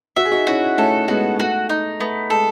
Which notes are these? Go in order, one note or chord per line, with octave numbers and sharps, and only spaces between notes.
F#4 E5
G#4
D#4 F#4
C#4 E4 F#4
A3 C#4 A4
G#3 B3 F#4
A3 F#4
D#4
A3 B3
G#3 A4